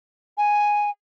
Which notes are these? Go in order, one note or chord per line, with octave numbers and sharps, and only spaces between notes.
G#5